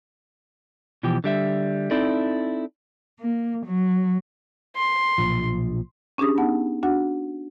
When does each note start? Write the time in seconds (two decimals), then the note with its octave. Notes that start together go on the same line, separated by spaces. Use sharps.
1.03 B2 E3 F3 G4
1.24 D3 G3 E5
1.91 C4 D#4 E4 A4 D5
3.20 A#3
3.66 F#3
4.76 C6
5.18 B1 A#2 F3
6.18 C#4 D4 G4 G#4 D#6
6.38 B3 D#4 F#5 A5
6.83 D4 F#4 F#5